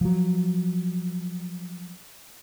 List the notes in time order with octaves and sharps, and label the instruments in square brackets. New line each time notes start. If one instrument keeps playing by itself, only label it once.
[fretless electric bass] F3 F#3